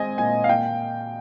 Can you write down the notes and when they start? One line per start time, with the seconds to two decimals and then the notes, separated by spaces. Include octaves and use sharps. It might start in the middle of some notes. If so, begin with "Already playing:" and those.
Already playing: G#3 C4 D#5 G#5
0.18 A#2 G#5
0.44 F5
0.49 A#2 G5